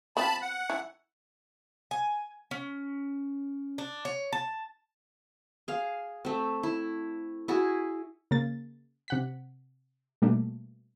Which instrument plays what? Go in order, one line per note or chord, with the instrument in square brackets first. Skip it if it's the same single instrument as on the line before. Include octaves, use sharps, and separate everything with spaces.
[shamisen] B3 C4 F4 [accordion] A5 B5
[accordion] F#5
[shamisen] E4
[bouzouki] G#5
C#4
D4
C#5
A5
[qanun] G#4 F5
A3 C4
E4
E4 F#4 G#4
[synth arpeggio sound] C#3 A#3 A6
C3 F#5 B6
B2 G3 A3 A#3 D4